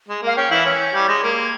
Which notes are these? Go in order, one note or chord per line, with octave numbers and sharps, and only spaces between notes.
G#3
A#3 F5
C#4 G5
E3 E4 F5
C#4 E6
G#6
G6
G3 G#6
G#3 A#6
A#3 G#6
G#6